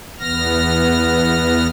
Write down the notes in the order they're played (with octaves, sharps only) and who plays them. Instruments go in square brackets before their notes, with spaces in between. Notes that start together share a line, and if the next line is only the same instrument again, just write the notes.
[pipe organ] E2 B3 F6 A#6